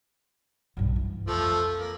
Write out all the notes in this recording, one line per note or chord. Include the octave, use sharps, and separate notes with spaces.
B1 G2
E3
F2 F3 A3
A#3